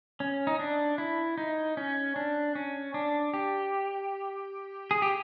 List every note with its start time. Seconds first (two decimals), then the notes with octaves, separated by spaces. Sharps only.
0.20 C#4
0.47 D#4
0.59 D4
0.98 E4
1.38 D#4
1.77 C#4
2.16 D4
2.55 C#4
2.94 D4
3.34 G4
4.91 G#4
5.02 G4